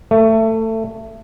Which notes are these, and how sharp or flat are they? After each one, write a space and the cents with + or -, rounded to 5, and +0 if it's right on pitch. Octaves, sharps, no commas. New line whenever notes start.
A3 +20